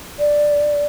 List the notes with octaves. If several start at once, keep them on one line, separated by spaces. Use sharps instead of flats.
D5